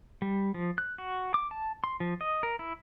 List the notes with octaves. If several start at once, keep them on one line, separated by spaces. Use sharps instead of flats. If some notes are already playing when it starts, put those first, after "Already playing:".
G3
F3
F#6
F#4
D6
A5
C6
F3
D#5
A#4
E4